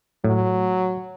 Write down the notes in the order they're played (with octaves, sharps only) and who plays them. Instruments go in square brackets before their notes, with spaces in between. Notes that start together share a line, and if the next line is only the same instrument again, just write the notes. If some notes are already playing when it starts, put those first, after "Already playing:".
[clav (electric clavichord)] A2 [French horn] F#3